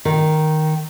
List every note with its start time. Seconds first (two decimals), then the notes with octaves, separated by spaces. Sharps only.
0.05 D#3